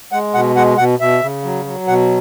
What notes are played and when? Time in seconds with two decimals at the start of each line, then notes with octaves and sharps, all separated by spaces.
0.12 G#3 F#5
0.34 B2 F#5
0.56 G#3 F#5
0.78 B2 F#5
0.99 B2 E5
1.22 C#3
1.44 F#3
1.65 F#3
1.87 B2 F#5